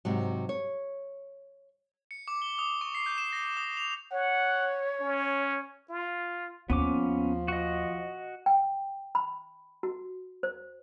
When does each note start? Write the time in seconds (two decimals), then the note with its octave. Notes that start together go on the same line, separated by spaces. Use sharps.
0.05 G#2 C3 F#3
0.49 C#5
2.11 C#7
2.28 D6
2.42 G7
2.59 D#6
2.81 C#6
2.95 C7
3.06 G6
3.18 E7
3.33 A#6
3.57 D#6
3.77 F7
4.12 C#5 F#5
5.00 C#4
5.89 F4
6.70 D#2 F3 B3 C#4 D6
7.48 F#4 D#5
8.46 G5
9.15 B5
9.83 F#4
10.43 C5